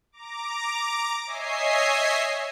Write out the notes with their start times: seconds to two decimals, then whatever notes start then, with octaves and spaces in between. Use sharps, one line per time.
0.12 A#5 D6
1.26 C#5 D#5 E5 G#5 C7